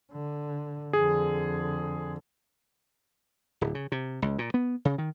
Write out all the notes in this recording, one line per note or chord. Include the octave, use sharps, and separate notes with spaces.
D3
F2 D3 G#4
D1
C#3
C3
C#2
A#2
B3
C#3
D#3